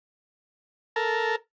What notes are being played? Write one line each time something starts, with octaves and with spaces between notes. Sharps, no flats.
A4 A#4